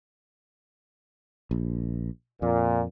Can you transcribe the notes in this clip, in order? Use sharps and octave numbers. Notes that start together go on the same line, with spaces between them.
A#1
F2 A#2